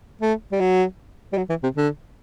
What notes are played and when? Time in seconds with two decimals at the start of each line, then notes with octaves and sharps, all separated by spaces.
0.22 A3
0.52 G3
0.60 F#3
1.33 G3
1.38 F#3
1.50 E3
1.63 C3
1.77 D3